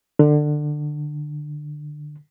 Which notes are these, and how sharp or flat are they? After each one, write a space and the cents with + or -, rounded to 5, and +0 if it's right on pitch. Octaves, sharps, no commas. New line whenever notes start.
D3 +20